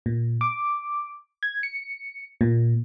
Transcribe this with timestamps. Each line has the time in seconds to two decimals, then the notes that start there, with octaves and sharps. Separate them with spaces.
0.06 A#2
0.41 D6
1.43 G#6
1.63 C#7
2.41 A#2